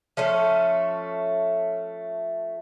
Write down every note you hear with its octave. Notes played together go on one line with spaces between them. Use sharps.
F3 A3 C#4